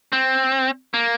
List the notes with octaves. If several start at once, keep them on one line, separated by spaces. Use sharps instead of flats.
C4
A#3